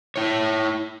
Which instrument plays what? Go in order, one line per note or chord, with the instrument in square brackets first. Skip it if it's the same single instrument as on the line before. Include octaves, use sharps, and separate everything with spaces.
[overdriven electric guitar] E4 C#5